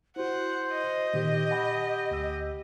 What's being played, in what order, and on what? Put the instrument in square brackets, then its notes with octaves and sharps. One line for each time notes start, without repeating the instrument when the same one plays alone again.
[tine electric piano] E4 F#4 [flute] C5 [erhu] F#5
[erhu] D#5
[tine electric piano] A#2 D#3 [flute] G4
[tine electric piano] F#5 G#5 B5
D2 E6